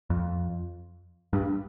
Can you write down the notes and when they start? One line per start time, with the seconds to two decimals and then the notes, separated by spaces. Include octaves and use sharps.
0.10 F2
1.33 G2